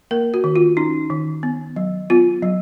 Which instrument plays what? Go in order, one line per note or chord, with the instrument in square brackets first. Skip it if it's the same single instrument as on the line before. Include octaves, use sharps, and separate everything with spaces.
[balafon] A#3 A#4
F#4
D#3
F4
C#4 D#4
D#3
B3
F#3
B3 F4
F#3